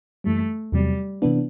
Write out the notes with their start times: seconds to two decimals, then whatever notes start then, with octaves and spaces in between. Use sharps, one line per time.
0.24 F#2 E3 G3 A3
0.72 E2 C3 F#3 G3
1.22 C3 E3 B3 D4